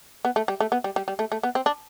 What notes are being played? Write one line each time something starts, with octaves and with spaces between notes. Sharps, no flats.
B3
A3
G3
A3
B3
G3
G3
G3
A3
A3
B3
C4
D4